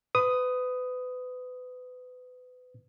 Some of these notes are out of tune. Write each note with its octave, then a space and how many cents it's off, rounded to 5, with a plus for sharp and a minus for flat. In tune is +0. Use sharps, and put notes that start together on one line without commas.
B4 +30 D#6 +0